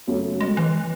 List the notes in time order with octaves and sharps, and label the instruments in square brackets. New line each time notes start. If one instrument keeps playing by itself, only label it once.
[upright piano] F#2 C#3 F#3 A3
[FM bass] G#3
E3